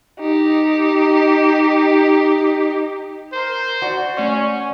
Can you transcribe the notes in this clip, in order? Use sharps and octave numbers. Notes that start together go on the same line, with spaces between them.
D#4 G4
A#4 C5
F#4 D5
A3 C#4 D5 G#5 C#6